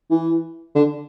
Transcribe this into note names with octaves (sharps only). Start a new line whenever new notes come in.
E3
D3